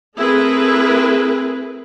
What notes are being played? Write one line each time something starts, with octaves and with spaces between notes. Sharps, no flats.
A3 C4 E4 G#4 A#4 B4